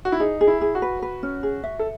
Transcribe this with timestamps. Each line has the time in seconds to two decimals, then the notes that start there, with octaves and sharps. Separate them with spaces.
0.05 F#4
0.12 E4
0.20 D#4 G#4
0.41 G#4
0.47 E4
0.61 G#4
0.75 F#4
0.82 B4
1.02 B4
1.23 C#4
1.43 G#4
1.64 E5
1.79 A4